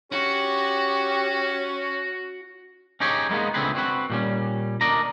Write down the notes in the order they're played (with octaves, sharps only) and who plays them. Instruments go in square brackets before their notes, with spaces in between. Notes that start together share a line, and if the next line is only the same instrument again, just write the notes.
[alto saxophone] C#4 [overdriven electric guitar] F#4 F#5 [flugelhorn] G4
[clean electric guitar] C#4 D#4 G4 G#4 C#5
G3 G#3 A#3 B3 D#4
C#2 D3 A3 C4 G#4 B4
C4 F#4 B4
A#2 G3 C#4
D2 D4 A#4 D5 D#5 A#5